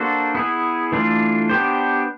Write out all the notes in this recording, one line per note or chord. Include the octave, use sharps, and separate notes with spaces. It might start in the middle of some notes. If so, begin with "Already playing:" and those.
Already playing: A#3 D4 F#4 A4 C5
B3 E4 G#4
E3 A3 D4 F4
B3 D4 G4 C5